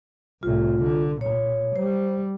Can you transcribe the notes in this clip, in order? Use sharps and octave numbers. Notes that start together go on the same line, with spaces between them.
C2 A2 F4
D3
A#2 C#5
G3 C5